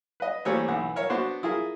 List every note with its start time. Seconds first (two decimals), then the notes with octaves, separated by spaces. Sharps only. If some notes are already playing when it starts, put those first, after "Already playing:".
0.20 B4 D#5
0.45 E3 G3 A3 A#3 C4 C#5
0.68 B1 E3 F#5
0.96 A#4 C#5 E5
1.10 B3 D4 F#4 C5
1.43 E4 F4 G#4 A#4